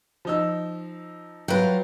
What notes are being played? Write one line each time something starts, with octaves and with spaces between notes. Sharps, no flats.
F3 D#4 E6
F#3 F4 B4 G5